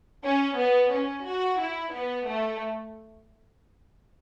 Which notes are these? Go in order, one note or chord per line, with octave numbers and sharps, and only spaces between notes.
C#4
B3
C#4
F#4
E4
B3
A3